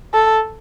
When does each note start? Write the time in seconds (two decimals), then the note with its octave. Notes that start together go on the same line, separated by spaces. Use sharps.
0.14 A4